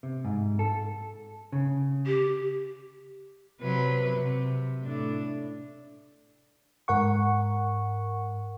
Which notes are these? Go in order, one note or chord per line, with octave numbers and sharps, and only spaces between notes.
C3
G#2
A4
C#3
G4
C3 F#3 B4
C3
A2 D4
G#2 A#4 F#5 C#6